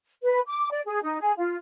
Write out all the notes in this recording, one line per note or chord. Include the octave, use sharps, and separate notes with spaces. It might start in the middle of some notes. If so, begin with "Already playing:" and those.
B4
D6
D5
G#4
D#4
G#4
F4